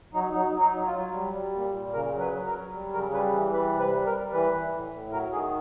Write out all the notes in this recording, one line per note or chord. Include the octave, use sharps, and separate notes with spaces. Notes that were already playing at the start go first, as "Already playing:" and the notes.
F#3 D#4
F#3 D#4
F#3
D#4
F#3
F4
F#3
G3
G3
A#2
A#2
C#3 A#4
F#3
B4
F#3
A#4
F#3
G3
C#3 A#4
G3 B4
E3
G3 B4
C3
B4
G3
A#4
G3
E3 B4
E3
A2
A2
F#3 A#4
D#3 G#4